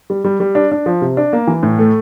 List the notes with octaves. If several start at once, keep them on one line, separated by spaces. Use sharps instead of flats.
G3
G3
G3
D4
D4
F3
C3
D4
A#3
E3
A2
A3